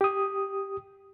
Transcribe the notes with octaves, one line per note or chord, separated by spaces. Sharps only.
G4 D#6